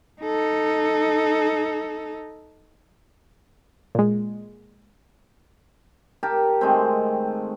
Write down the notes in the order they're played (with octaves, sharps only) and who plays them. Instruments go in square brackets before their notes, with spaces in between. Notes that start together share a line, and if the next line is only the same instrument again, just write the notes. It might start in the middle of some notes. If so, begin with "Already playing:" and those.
[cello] D#4 A4
[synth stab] A#2 G#3
[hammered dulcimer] G4 A#4 A5
D#3 G#3 A3 C4